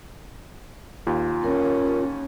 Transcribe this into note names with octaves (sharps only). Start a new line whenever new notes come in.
D#2 F4
C#4 A#4 C#5